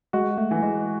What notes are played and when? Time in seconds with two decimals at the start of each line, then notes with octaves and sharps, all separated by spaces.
0.13 G#3 F#4
0.38 A3
0.51 E3
0.63 G#3